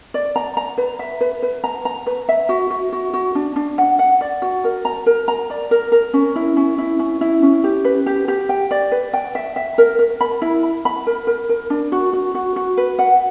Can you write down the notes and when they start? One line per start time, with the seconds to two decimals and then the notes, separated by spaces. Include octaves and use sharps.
0.14 D5
0.36 A#5
0.57 A#5
0.78 B4
0.99 E5
1.21 B4
1.43 B4
1.64 A#5
1.85 A#5
2.07 B4
2.29 E5
2.49 F#4
2.70 F#4
2.93 F#4
3.14 F#4
3.35 D4
3.56 D4
3.78 F#5
3.99 F#5
4.21 D5
4.42 F#4
4.64 A#4
4.85 A#5
5.06 A#4
5.28 A#5
5.50 D5
5.71 A#4
5.92 A#4
6.13 C#4
6.36 E4
6.56 C#4
6.78 E4
6.99 C#4
7.21 E4
7.42 C#4
7.64 G4
7.85 B4
8.06 G4
8.28 G4
8.49 G5
8.71 D5
8.92 B4
9.13 G5
9.35 E5
9.56 E5
9.78 A#4
9.99 A#4
10.21 B5
10.42 E4
10.63 B5
10.85 B5
11.07 A#4
11.27 A#4
11.49 A#4
11.70 D4
11.92 F#4
12.13 F#4
12.35 F#4
12.56 F#4
12.77 B4
12.99 F#5